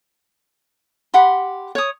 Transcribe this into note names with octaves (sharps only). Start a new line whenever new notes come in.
G4 F#5 B5 C6
C#5 D#6